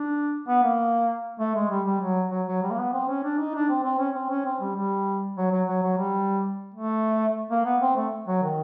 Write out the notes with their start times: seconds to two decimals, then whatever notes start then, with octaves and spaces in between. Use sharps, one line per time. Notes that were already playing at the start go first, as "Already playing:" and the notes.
Already playing: D4
0.48 B3
0.63 A#3
1.40 A3
1.55 G#3
1.70 G3
1.86 G3
2.01 F#3
2.31 F#3
2.47 F#3
2.62 G3
2.71 A#3
2.78 B3
2.93 C4
3.08 C#4
3.24 D4
3.39 D#4
3.54 D4
3.69 C4
3.84 C4
3.99 C#4
4.15 C4
4.30 C#4
4.45 C4
4.61 G3
4.76 G3
5.37 F#3
5.52 F#3
5.68 F#3
5.83 F#3
5.98 G3
6.74 A3
7.51 A#3
7.65 B3
7.82 C4
7.96 A3
8.28 F#3
8.43 D#3